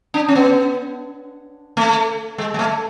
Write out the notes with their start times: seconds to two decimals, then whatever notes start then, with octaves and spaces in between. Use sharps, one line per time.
0.14 D4
0.28 C#4
0.35 B3
1.77 A3
2.38 G#3
2.54 G#3
2.59 A3